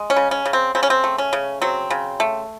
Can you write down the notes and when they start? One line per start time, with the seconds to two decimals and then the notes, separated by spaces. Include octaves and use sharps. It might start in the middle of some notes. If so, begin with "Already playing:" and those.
Already playing: G#3
0.10 C#4
0.16 C#3
0.31 C#4
0.46 C#3
0.53 C4
0.75 C#3 C4
0.83 C#4
0.90 C4
1.04 A3
1.18 C#4
1.33 C#3
1.62 F#3 C4
1.90 C#3
2.20 A3